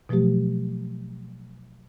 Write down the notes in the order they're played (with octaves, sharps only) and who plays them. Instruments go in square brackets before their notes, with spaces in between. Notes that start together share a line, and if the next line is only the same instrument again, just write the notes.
[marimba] B2 F3 F#3 A3 G4